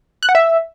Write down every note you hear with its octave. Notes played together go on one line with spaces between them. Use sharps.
F#6
F#5
E5